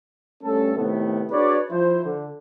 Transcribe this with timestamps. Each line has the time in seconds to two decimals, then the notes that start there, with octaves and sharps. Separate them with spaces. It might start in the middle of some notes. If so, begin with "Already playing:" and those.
0.43 G2 A3 C#4 A4
0.77 A2 C3 D#3 A3 B3
1.30 D4 F#4 G#4 B4 C#5 D5
1.70 F3 E4 C5
2.05 D3